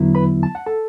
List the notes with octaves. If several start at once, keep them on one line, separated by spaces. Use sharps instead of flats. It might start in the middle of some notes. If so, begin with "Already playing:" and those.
Already playing: E2 D3 F#3 B3 E4
B4 B5
A5
F#5
A4 A5